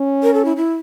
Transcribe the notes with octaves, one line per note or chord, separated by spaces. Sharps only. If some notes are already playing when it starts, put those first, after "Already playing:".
Already playing: C#4
A#4
A4
E4
E4